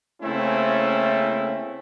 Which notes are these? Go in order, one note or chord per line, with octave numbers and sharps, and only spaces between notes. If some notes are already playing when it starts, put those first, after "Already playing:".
C#3 A3 A#3 C4 C#4 E4